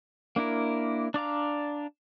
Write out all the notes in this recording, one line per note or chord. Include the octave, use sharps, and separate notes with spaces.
A#3 D4 E4 A#4
D4 D5 F5 A#5